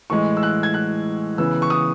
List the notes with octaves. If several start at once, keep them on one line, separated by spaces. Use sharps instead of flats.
A2 E3 G#3 C#6
E6
F#6
G#6
F#6
C#3 E3 B3 E6
C#6
D#6